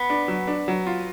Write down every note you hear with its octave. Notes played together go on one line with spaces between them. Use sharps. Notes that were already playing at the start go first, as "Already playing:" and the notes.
Already playing: B3
D4
F#3
D4
F#3
F4